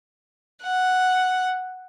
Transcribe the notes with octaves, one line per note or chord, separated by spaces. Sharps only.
F#5